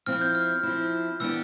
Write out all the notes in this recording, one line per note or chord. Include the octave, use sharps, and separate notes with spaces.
F3 C4 E4 F6
G6
F6
F3 C4 E4
E3 B3 D4 G4 E6